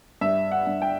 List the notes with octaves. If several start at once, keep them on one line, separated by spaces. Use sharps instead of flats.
G2 E5
F#5
G2
G5